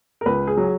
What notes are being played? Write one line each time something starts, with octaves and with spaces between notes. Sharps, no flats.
A#4
C#2 B4
G#4
F#3